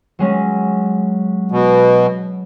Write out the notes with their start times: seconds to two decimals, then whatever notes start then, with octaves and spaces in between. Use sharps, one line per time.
0.19 F#3 G#3 C#4
1.51 B2